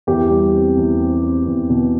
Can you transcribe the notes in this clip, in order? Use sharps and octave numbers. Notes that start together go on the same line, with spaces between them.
E2 G4
G3
C4
E2
C4
C4
E2
B2